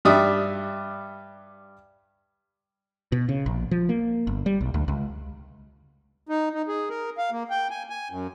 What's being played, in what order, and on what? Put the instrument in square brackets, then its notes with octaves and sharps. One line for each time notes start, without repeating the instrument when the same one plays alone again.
[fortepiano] G2 G3 D5 E5 D#6
[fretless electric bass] B2
C#3
A#1
F3
A#3
G1
G3
B1
D2
C#2
[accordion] D#4
D#4
G#4
A#4
F5
A#3
G5
G#5
G#5
F#2